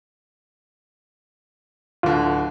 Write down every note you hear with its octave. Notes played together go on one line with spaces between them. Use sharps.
D1 D3 F4